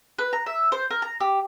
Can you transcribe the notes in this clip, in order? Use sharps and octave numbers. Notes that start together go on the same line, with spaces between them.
B4
A#5
E5
C5
A#4
A#5
G4